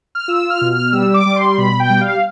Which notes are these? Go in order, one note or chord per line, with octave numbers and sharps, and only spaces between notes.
F6
F4 E6
F6
B2
F6
G3 E6
D6
G3
C6
B2 B5
G5
G3
F5